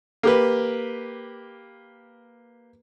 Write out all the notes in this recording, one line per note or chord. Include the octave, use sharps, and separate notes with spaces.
A#3 G4 B4